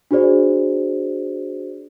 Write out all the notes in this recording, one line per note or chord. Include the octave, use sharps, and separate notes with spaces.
D4 F#4 G#4 C5 D5